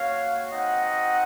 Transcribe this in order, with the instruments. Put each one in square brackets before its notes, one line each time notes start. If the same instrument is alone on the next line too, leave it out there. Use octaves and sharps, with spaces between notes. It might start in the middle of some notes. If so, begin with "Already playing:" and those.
Already playing: [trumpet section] A#3 C#4 F#4 C#5 F5
C4 D#4 F#4 D#5 F#5